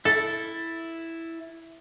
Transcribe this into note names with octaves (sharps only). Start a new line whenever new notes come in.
E4 A4 A6